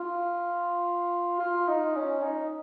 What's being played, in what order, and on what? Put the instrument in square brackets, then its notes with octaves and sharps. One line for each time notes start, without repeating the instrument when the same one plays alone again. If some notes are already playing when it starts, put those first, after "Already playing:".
Already playing: [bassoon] F4
F4
D#4
C#4
D#4